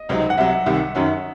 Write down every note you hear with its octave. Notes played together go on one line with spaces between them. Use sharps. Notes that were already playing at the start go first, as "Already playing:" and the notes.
Already playing: D#5
C#2 C3 F#3 C4 D#4
F#5
C2 C3 F#3 E5
C2 C3 D#3
F#2 D#3 F#3 C#4